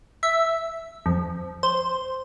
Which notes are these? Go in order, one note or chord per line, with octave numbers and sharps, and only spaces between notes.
E5
F2
C5